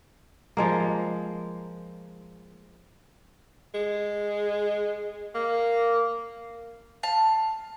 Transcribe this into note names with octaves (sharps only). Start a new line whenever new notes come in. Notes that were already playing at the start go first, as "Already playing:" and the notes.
F3 G#3 A#3
G#3
A#3
F5 A5